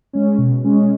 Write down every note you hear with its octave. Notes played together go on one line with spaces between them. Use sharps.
G#3 C#4
B2
G#3 C#4